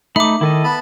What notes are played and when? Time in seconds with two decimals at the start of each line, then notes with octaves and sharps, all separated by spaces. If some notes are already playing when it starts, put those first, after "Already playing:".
0.16 A3 D#4 E5 B5 D6
0.41 D#3 E4 A4 D#5
0.64 B3 A5 B5